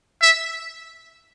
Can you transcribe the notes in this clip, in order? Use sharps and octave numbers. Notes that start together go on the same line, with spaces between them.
E5